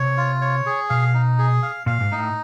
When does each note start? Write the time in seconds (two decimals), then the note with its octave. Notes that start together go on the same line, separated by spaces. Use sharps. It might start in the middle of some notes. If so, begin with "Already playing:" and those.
Already playing: C3 C#5
0.17 F4
0.41 C#5
0.66 G#4
0.90 B2 F5
1.14 D#4
1.39 G#4
1.63 F5
1.86 A#2 F5
2.00 G#2
2.12 A2 D#4